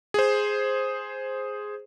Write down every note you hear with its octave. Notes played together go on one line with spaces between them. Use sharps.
G#4 C5